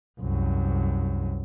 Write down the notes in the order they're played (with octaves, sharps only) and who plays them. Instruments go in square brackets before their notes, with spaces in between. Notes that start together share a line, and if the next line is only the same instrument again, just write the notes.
[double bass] C2 F#2